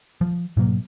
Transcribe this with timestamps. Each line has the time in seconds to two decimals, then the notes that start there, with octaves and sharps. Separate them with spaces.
0.21 F3
0.57 G#2 B2 F#3 A#3